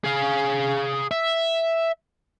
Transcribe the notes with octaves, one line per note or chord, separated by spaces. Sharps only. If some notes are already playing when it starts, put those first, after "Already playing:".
G#4 F5
E5